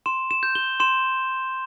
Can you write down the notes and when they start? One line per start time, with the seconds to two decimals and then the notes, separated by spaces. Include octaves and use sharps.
0.06 C6 E7
0.31 E7
0.43 G6
0.55 G7
0.80 C6 E7